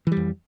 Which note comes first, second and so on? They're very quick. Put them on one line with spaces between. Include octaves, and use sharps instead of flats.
E3 G3 F2